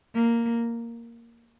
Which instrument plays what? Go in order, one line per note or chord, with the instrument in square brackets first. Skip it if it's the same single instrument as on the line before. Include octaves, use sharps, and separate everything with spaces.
[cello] A#3